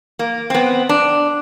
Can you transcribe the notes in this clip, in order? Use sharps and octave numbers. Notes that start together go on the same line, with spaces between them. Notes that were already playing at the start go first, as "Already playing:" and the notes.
A#3
B3 C4
D4